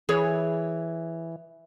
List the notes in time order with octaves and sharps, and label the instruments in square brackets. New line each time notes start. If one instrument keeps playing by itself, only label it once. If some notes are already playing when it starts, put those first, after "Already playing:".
[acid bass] E3 [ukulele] G#4 C#5